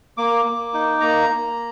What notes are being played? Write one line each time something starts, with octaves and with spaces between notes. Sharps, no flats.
A#3 D6
A#3
D#4
A#3 A#5
A#3